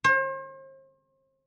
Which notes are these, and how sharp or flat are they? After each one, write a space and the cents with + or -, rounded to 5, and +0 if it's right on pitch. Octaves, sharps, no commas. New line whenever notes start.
C5 +40